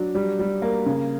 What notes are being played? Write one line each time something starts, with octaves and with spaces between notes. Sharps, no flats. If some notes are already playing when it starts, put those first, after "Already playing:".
Already playing: F#3 D4
G3
G3
A#3
C#3